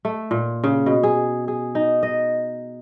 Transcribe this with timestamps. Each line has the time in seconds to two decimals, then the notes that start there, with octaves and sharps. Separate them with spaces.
0.05 A3
0.31 A#2
0.64 C#3
0.86 B2
1.03 G#4
1.48 G#4
1.75 D#4
2.03 D#5